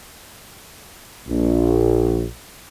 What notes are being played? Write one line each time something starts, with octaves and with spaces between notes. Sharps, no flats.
A#1